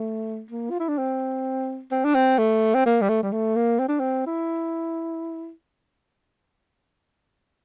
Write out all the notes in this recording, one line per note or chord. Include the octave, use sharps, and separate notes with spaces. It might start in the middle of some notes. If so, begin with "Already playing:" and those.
Already playing: A3
A#3
F4
E4
D4
C4
C4
D4
C4
A3
C4
A#3
G3
A3
G3
A3
A#3
C4
D4
C4
E4